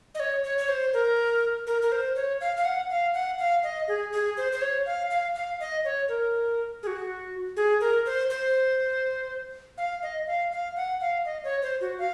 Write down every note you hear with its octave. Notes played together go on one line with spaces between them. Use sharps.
D#5
C#5
C#5
C#5
C5
A#4
A#4
A#4
C5
C#5
F5
F5
F#5
F5
F#5
F5
D#5
G#4
G#4
C5
C5
C#5
F5
F5
F5
D#5
C#5
A#4
G#4
F#4
G#4
A#4
C5
C5
F5
D#5
F5
F5
F#5
F5
D#5
C#5
C5
F#4
F5